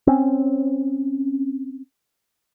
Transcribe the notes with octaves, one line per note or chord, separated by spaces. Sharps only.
C4 C#4